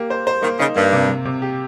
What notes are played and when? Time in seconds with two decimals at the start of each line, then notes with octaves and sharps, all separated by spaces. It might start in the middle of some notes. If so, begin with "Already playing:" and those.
Already playing: A#3 G4
0.10 C5
0.27 C5
0.42 D#3 A#3
0.59 C#3 D#4
0.75 G2 A#3
0.93 C3
1.09 C3
1.25 C3
1.42 G4